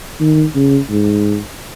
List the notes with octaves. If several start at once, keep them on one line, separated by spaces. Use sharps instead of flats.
D#3
C#3
G#2